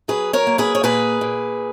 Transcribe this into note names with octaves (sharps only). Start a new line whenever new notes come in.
F#3 G#4 B4
A#4 C#5
A#3
G#4 B4
C#5
A#2 G#4 B4
A#2